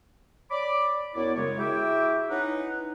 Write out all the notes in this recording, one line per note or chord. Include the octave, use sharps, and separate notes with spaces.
C#5 D5 B5 D6
F#2 B3 E4 C#5 D5
F#2 C#3 G#3 C#5
E4 F#4 G#4 E5 G5 D6
C#4 D#4 E4 B4 D#5 F#5